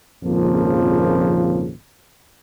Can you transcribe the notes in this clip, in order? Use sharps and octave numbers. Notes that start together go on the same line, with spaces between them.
G#1 F2 A#2 C#3 F3 A#3